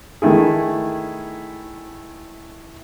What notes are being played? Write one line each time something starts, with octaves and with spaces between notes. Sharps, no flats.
D#3 A3 E4 G#4